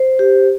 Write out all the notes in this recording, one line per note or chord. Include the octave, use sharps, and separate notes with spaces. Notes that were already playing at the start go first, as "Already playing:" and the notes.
Already playing: C5
G4